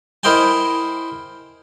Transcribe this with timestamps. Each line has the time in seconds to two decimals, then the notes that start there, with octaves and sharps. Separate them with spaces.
0.23 E4 A#4 C5 D#5 G5 G#5